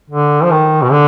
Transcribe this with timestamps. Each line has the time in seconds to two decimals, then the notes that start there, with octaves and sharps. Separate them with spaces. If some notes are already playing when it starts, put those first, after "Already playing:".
0.10 D3
0.43 F3
0.51 D#3
0.82 B2
0.92 D3